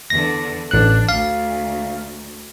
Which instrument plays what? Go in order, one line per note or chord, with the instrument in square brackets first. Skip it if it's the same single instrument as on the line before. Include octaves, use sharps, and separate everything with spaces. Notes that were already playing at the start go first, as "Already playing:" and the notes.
[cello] E2 D3 [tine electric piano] A#6
[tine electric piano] A1 F#6 [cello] D4
[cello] D2 [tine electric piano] F5